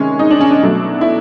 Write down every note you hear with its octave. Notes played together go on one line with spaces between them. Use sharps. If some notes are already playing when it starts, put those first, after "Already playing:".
Already playing: C3 D#3 G#3 C#4
D#4
D4
C#4
D4
B2 F#3 A3
E4